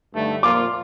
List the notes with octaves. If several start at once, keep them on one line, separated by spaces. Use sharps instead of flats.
G2 D3 A3 D#4
A#2 F3 A#3 F4 D6